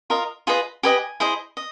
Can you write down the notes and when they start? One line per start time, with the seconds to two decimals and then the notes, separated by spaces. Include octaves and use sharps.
0.10 F4 A#4 D#5
0.47 F4 G#4 B4 D#5
0.83 G4 B4 D#5 G#5
1.20 E4 G#4 C5 D#5
1.57 D#5